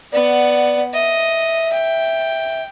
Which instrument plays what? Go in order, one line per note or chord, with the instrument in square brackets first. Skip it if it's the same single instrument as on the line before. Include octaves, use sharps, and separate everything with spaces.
[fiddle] B3 F#5 [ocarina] D5
[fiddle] D#5 [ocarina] E5
[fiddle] G5